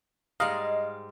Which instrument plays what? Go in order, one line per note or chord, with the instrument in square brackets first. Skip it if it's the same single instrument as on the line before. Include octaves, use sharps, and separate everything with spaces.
[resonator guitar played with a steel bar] G#2 G3 G#3 [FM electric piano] D#5 [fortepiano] F5